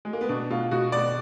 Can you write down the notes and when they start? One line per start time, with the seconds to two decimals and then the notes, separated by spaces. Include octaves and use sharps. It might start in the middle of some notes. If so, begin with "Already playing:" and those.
0.05 G#3
0.13 A#3
0.21 B3
0.29 B2 D4
0.50 B2 F4
0.71 B2 F#4
0.92 B2 D5